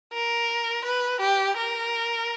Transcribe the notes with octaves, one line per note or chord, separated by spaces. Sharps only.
A#4
B4
G4
A#4